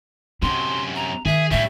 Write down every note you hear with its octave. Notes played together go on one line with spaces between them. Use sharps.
F#2 C3 D4 C6
A#5
D#3 G#4 E5
A2 G3 C#4 D4 E5